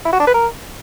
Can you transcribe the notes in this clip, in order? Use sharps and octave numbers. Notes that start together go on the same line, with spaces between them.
E4
F#4
D4
B4
A#4